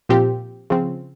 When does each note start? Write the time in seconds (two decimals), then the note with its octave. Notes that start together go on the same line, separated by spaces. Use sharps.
0.09 A#2 F3 C4 G4
0.70 C#3 F3 C4